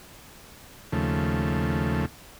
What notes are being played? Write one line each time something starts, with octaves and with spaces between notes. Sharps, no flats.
D#2 C#3 F3 A3